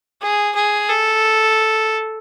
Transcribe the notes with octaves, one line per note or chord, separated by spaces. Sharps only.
G#4
G#4
A4